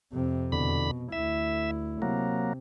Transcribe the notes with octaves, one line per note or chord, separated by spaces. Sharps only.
F2 C3
E2 B2 D3 B5
D2 E4 E5
C3 F#3 A#3